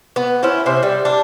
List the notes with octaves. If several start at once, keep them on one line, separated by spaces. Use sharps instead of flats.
B3
C#4 E4 C5
C3 C5 E5
G3
D4